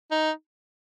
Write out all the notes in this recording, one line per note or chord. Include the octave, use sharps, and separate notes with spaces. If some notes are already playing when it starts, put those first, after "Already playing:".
D#4